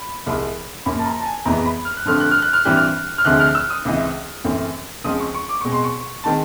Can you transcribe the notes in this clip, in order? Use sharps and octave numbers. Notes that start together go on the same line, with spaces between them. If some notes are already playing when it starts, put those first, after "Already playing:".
Already playing: B5
C2 C3 F3 G#3
F#2 C#3 F3 A#3 B5
A5
A#5
A5
G#5
F2 C3 E3 G#3 B3 A#5
B5
F6
F#6
G2 D3 F3 A3 C4 F6
F#6
F6
F#6
F6
G2 E3 G3 C4 F#6
F6
F6
D2 C3 F3 G#3 F#6
F6
E6
D#6
C#2 C3 E3
F#2 C#3 E3 A3 C4
C#2 C#3 F3 G#3 C4 D#6
C#6
C#6
D6
B2 G#3 C4 C#6
C6
C#6
D#3 G#3 C4 A5